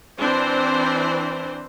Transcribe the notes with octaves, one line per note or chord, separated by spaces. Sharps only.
E3 C4 D4 C5